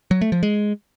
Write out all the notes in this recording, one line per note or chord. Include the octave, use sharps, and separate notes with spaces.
F#3
A3
F3
G#3